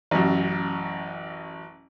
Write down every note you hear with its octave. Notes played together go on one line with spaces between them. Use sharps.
A1 F#2